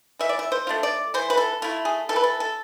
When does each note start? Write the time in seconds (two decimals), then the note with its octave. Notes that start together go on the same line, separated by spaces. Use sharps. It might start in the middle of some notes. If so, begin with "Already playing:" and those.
0.19 E3 E5
0.29 D5
0.39 E5
0.52 C5
0.67 A3 D4 F4
0.83 D5
1.14 E3 C5
1.30 B4
1.37 A4
1.62 A3 E4 F4
1.85 G#4
2.09 E3 A4
2.16 B4
2.24 A4
2.40 A4